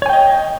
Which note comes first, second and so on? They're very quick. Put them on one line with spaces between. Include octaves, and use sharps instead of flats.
C#5 G#5 G5 D#5